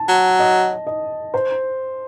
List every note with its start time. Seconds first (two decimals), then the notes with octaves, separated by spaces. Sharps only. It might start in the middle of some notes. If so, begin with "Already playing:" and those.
Already playing: A5
0.09 F#3
0.39 D#5
0.87 D#5
1.34 C5